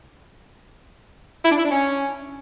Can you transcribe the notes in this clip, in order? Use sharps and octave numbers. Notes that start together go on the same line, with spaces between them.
E4
D4
E4
D4
C#4